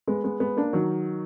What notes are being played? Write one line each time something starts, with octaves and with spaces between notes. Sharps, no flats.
G#3 B3
G#3 B3
G#3 B3
A#3 D4
D#3 F#3